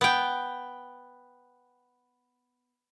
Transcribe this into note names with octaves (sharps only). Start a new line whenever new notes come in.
B3 G5